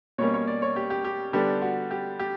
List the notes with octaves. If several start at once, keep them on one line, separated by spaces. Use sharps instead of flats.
B2 G3 A#3 C#4 C#5
C#5
D5
C#5
G4
G4
G4
D3 G3 B3 D4 G4
F#4
G4
G4